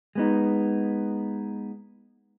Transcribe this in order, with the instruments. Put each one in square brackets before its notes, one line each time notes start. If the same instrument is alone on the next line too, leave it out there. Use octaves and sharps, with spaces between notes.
[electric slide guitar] G#3 B3 D#4